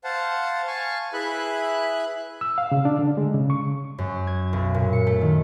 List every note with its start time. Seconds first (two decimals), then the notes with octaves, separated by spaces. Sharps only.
0.04 C5 F5 F#5 A5
0.67 F5 G#5 A5 C#6
1.13 E4 G#4 B4 E5 B5 F#6
2.41 E6
2.58 F5
2.72 C#3
2.85 D4
2.99 D3
3.17 G#3
3.34 C#3
3.50 C#6
3.98 F#2
4.27 G#6
4.53 B1
4.74 A#2
4.93 C#7
5.07 A3
5.21 D#3